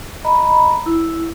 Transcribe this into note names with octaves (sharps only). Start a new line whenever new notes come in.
D#5 A#5 B5
E4